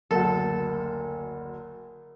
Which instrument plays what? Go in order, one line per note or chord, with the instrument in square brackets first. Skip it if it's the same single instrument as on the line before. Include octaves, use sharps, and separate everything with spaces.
[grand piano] F#1 D2 [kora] A4 [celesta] A#4